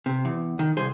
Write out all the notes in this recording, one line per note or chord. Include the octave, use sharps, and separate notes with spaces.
C3
E2
D#3
C2 G#4 C5